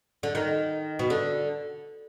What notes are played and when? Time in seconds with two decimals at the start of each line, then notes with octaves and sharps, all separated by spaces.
0.23 D3
0.35 D#3
0.99 B2
1.10 D3